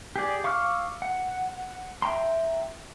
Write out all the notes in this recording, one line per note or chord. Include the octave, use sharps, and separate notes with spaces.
G4 G#4 D5
F5 C#6 D6 E6 F6
F#5
E5 G5 A#5 C6